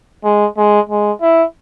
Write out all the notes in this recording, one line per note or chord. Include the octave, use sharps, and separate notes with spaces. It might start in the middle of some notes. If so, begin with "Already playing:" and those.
G#3
G#3
G#3
E4